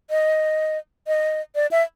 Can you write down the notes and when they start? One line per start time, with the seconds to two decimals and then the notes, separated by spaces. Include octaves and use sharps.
0.10 D#5
1.07 D#5
1.55 D5
1.71 E5